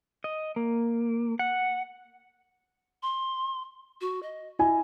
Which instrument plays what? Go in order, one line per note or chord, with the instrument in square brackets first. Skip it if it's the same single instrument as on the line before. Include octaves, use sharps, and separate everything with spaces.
[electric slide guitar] D#5
A#3
F#5
[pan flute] C6
F#4
D#5
[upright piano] E4 G#5 [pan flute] D#5